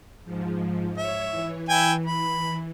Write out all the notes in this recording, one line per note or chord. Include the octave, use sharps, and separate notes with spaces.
G#2 F3
C#5 E5
E3
E4 G5 G#5
B5